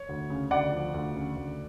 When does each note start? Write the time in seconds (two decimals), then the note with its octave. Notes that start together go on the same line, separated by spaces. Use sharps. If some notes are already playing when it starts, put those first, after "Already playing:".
Already playing: C#5
0.09 D2
0.30 C#3
0.51 D2 D5 F#5
0.72 F3
0.94 D2
1.15 C#3
1.36 D2